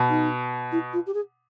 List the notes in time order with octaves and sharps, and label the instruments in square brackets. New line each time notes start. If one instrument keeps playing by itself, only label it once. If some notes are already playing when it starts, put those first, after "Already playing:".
Already playing: [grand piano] B2
[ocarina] D#4
E4
F4
G4
G#4